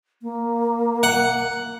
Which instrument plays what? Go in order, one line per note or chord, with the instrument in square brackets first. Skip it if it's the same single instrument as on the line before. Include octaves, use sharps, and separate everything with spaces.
[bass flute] A#3
[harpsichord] F#5